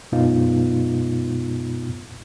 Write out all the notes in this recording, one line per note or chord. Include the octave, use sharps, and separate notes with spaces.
F#2 B2 G#3 B3 D#4 F4